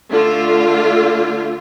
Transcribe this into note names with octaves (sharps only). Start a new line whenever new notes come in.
D3 A3 F4